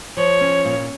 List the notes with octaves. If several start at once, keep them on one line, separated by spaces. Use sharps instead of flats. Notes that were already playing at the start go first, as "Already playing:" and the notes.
F3 C#5
C#4
A#2